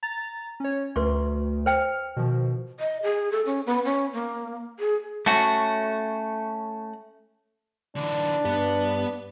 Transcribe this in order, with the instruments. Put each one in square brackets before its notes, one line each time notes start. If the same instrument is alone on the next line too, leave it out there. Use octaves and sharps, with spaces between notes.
[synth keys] A#5 A6
C#4 C#5
[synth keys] D2 [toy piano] B4 C6 C#6
[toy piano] C5 G5 [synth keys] F6
[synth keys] B2 D#3 F3
[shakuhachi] D#5
G#4
A4
C#4
B3
C#4
A#3
G#4
[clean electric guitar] A3 C#4 F#4
[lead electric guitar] D3 E3 [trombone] D4
[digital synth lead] G2 [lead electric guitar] B3